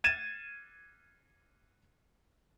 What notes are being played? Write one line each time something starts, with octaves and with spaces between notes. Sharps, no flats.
G#6 A6 D#7 E7